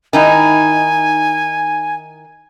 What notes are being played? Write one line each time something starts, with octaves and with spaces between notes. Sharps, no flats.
D#3 D#4 E4 G#5